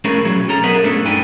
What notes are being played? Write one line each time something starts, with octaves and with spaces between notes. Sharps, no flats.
A3 C#4 D4 E4 G#4 A#4
B1 F#3 G#4
C#4 A4 A#5
B3 G#4 A#4 D#5 E5 F#5
B1 G2 A3 C#4 D4 A4
B3 D4 D#4 B4 G5 G#5